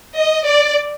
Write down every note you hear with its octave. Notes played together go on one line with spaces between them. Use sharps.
D#5
D5